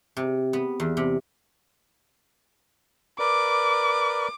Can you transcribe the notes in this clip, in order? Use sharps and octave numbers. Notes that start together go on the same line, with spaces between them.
C3
B3
E2
C3
A#4 B4 D5 D6